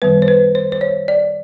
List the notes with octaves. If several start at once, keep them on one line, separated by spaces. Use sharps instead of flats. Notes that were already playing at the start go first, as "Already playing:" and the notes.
F#2 D#3 G3 B3 B4
C5
B4
C5
C5
C#5
D5